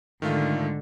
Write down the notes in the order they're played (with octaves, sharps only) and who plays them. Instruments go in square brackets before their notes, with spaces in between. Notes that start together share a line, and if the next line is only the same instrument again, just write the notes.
[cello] G#2 D3 [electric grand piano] D#3 A3 F4